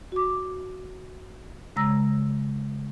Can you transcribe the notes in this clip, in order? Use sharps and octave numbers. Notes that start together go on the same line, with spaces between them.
F#4 D6
C#3 G#3 A#5 E6 A#6